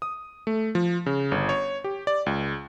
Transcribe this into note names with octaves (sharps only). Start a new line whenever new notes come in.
D#6
A3
F3
C#3
G1
C#5
G4
D5
C#2